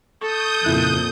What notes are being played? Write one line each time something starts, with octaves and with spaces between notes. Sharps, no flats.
A4 C#6 D#6 G6
F2 A#2 C#3 E4 F#6